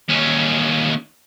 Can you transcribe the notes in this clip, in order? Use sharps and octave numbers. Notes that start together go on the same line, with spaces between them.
D#2 C#4